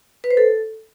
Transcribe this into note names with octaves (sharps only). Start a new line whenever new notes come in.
B4
C5
A4